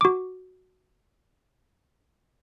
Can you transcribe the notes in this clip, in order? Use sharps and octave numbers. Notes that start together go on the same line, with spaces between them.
F#4 D6